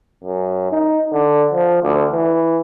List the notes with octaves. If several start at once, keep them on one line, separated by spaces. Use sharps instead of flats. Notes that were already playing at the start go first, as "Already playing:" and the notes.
F#2
D#4
D3
F3
D2
E3